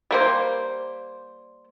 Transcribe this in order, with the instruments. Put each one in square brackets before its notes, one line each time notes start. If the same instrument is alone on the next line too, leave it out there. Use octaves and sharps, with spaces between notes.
[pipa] G3 A#3 C5